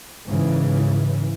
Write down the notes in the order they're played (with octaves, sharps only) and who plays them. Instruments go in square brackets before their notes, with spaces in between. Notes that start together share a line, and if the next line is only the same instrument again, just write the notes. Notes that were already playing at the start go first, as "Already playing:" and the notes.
[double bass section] G#2 C#3 E3